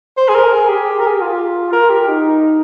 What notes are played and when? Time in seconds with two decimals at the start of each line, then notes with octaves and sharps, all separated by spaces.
0.17 C5
0.28 G#4
0.35 A#4
0.53 G#4
0.69 G4
0.99 A#4
1.07 G#4
1.14 G4
1.21 F4
1.73 A#4
1.90 G4
2.08 D#4